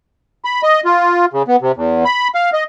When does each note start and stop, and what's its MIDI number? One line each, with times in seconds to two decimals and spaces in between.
0.45 0.62 83
0.63 0.81 75
0.85 1.26 65
1.33 1.43 49
1.48 1.56 59
1.61 1.72 48
1.76 2.04 40
2.05 2.28 83
2.35 2.50 77
2.53 2.64 75